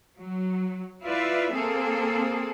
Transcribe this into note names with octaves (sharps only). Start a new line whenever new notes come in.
F#3
E4 F4 B4 D5 E5
A#3 C4 G#4 A4